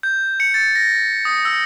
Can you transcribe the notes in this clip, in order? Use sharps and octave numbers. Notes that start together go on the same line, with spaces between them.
G6
C#7
A6
A#6
D#6
E6